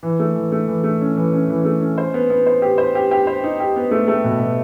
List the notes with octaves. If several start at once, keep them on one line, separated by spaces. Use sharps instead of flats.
E3
A3
E3
A3
E3
A3
C#4
E3
C#4
E3
A3
C#4
C5
B3
B3
C5
G4
C5
G4
G4
C5
D#4
G4
B3
A3
A3
B2
B2